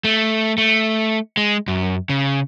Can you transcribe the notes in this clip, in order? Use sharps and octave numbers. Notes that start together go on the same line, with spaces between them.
A3
A3
G#3
F#2
C#3